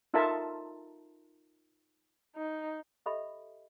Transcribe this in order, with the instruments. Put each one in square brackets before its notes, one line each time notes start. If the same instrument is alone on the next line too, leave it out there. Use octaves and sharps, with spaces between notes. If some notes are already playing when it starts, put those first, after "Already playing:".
[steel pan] D#4 F4 A4 A#4 E5 A5
[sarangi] D#4
[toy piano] G4 A4 D#5 E5 B5